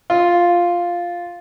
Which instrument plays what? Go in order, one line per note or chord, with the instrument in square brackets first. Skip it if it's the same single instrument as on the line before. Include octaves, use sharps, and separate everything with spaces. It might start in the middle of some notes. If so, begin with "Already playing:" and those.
[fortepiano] F4